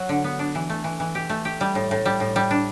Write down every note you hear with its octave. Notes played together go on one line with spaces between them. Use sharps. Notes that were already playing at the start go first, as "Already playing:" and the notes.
Already playing: F#3
D3
B3
D4
E3
A3
E3
E3
G4
A3
G4
G3
A2
A2
G3
A2
G3
D4